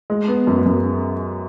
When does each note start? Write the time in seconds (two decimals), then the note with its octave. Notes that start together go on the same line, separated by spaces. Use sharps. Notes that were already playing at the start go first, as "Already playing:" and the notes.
0.10 G#3
0.28 B3
0.47 F#2
0.66 F#2